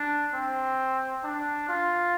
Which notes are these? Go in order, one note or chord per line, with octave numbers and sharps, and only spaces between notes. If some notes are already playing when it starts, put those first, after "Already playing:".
Already playing: D4
C4
D4
F4